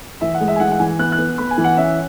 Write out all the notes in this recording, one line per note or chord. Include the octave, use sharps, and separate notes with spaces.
E3 E5
F#5
G#3
E5
G#5
E3 F#5
F#5
E3 G#5
B3 F#6
F#6
B3
B3 B5
G#5
E3
F#5
C#4 E5